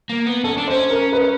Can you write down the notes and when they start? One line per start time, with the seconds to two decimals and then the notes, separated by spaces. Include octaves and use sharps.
0.09 A#3
0.26 B3
0.44 C#4 A4
0.58 D4
0.68 C5
0.70 C#4
0.90 A#4
1.13 B4